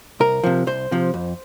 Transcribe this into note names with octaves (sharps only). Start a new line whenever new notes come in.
C2 A#4
C3 F3
C2 C5
C3 F3
F2